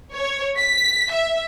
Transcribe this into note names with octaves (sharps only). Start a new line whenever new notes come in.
C#5
B6
E5